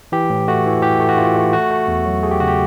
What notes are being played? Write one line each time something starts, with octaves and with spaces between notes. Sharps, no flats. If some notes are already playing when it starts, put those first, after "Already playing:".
E3 G4
A2
A3 F#4
E3
E3 G4
A3
F#4
E3 F4
A3
A3 F#4
A3
E2
F#3
A3 G#4
G4
C#3 F#4
G4